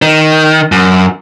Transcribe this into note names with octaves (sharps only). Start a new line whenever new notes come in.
D#3
F#2